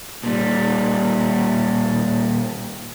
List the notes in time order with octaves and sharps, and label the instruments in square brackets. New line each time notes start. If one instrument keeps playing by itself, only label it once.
[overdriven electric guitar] A#2 G3